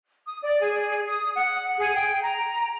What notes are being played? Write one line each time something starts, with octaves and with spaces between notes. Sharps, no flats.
D#6
D5
G#4
D#6
F#5
G#4
G5
A#5